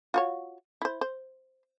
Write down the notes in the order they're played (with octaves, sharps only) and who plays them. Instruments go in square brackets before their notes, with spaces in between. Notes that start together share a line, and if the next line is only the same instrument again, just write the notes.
[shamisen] F4 F#4 C#5
E4 C5
C5